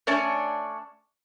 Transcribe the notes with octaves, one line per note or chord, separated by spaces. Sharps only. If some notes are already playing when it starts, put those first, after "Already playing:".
A3 C#4 D4 C#5 D5 G#5